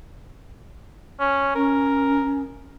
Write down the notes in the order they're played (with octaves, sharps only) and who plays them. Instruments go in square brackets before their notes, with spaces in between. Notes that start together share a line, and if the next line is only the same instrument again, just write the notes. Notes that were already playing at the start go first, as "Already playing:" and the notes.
[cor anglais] C#4
[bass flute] C#4 [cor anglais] A#4